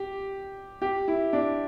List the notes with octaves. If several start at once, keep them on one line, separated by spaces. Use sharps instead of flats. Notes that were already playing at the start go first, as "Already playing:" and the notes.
Already playing: G4
G4
E4
D4